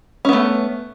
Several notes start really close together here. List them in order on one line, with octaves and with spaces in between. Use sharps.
C#4 B3 A3